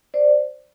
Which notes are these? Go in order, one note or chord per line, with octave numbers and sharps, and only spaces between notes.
C5 D5